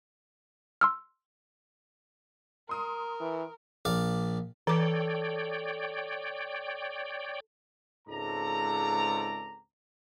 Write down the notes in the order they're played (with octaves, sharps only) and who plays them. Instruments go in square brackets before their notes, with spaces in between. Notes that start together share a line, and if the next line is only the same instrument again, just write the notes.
[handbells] C6 E6 F6
[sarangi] A#4 [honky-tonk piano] C6 D#6
[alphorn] E3
[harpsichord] A#1 D5 F5
[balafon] E3 D6 [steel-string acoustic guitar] A4 [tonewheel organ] C#5 D5 G5
[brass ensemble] C#2 G#2 C4 A4 D5 A#5